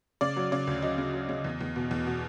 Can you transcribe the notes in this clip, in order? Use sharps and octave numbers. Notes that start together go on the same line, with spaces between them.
C#3 D5
F#3
C#3 D5
D2
F#3 D#5
C#3
F#3
C#3
E2
E2
B2
E2
B2